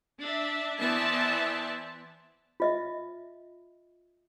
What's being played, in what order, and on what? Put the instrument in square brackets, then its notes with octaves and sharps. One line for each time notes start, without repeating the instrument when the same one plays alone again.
[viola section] D4 E5
E3 B3 C5 D5 E5 A5
[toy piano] F4 D#5 E5